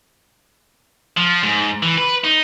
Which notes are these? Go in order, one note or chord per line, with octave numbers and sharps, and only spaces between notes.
F3
G#2
E3
B4
D#4